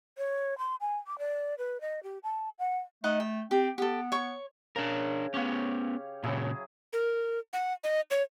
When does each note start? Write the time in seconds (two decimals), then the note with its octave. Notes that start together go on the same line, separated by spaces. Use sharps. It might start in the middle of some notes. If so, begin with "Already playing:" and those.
0.18 C#5
0.58 C6
0.81 G#5
1.07 D6
1.19 D5
1.58 B4
1.81 D#5
2.03 G4
2.23 A5
2.59 F#5
3.04 A3 D#4 D#5 F#5
3.20 G5
3.51 C4 G4
3.78 B3 G4 A4
4.12 C#5 C#6
4.76 C#3 D4 A#4
5.34 B3 C#4 G4 C#5 F5
6.23 A#2 C#3 F#3 E4 G#4
6.93 A#4
7.53 F#5
7.84 D#5
8.11 C#5